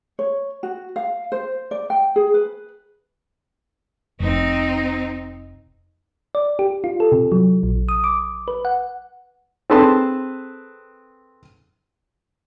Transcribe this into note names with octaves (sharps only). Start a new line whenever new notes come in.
C#5
F#4
F5
C5
D5
G5
G#4
B4
F1 C4 D#4
D5
G4
F4
A4
C3
F#3
A#1
D#6
D6
B4
F#5
C4 G#4 A4 B4 A5 C6